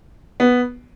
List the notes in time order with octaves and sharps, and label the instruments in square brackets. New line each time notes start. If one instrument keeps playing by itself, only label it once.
[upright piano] B3